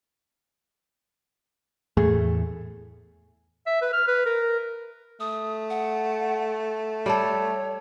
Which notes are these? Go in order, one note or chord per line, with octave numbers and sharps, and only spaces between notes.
E2 A2 A3 G#4
E5
B4
F6
B4
A#4
A3 D#6
F#5
G3 A4 C#5